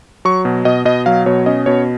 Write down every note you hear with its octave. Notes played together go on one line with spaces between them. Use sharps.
F#3 C#6
B2
B2 D#5
B2 D#5
F#3 F5
B2 C#5
C#4 D#5
B2 C#5